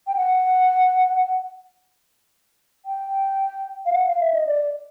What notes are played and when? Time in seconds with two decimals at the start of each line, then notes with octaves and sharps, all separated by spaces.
0.07 G5
0.16 F#5
2.86 G5
3.86 F5
3.92 F#5
4.07 F5
4.20 E5
4.34 D#5
4.47 D5